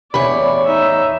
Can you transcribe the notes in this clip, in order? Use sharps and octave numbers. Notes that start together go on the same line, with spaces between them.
E2 A2 C#5 D5 B5
D#4 E5